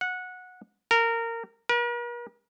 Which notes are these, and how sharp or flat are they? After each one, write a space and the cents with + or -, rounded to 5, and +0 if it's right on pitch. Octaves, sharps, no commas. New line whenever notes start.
F#5 -15
A#4 -20
A#4 +45